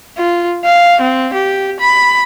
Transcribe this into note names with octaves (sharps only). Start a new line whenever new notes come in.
F4
F5
C4
G4
B5